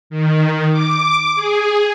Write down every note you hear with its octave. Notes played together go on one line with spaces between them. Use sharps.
D#3
D6
G#4